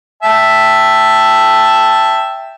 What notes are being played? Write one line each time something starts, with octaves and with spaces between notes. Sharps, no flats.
E5 G5 A5